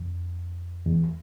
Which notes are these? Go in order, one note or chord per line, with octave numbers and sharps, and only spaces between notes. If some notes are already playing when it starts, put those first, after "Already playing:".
Already playing: F2
E2